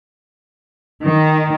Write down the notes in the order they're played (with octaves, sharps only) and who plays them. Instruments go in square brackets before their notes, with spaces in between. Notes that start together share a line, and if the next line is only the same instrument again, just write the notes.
[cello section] D#3